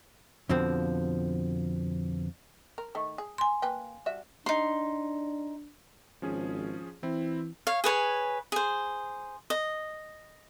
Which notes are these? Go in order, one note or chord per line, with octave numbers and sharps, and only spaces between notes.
F2 B2 D3 F3 C4
A#4
D#3 A3
G#4
G#5 C6
A#3 B4 G5
G3 F#4 E5
D4 D#4 C6
G#1 F3 C#4 G#4
E3 C4 E4
C#5 F5
G#4 B4 C#5 G#5
G#4 C5
D#5